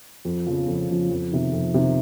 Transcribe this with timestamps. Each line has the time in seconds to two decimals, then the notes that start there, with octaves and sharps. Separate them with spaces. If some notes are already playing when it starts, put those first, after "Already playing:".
0.25 F2
0.47 C#3 F3
0.68 F2
0.89 C#3 F3
1.11 F2
1.31 C3 D#3
1.53 F2
1.74 C3 D#3